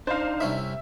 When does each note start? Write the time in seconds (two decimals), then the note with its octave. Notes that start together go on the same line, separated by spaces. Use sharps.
0.07 D4 D#4 C5 F5
0.40 C2 C#4 E4 E5